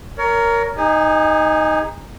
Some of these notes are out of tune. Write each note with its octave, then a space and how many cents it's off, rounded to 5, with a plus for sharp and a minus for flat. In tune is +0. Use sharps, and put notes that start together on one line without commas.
A#4 +0 C#5 +30
D#4 +0 G#4 -40 G#5 +0